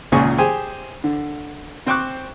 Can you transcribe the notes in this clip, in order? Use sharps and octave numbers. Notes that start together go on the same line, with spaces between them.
G#1 C#2 A#2 C#3 G#4 C#6
G4 G#4 C5 G#5
D3
C4 C5 G5 C#6 D6 F#6